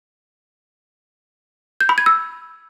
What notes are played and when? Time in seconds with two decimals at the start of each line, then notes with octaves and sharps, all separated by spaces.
1.81 G6
1.89 B5
1.98 G#6
2.06 E6